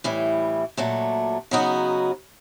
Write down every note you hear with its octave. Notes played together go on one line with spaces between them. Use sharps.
A2 E3 G3
A#2 F#3 A3 D4
C#3 F#3 B3 D#4 F#4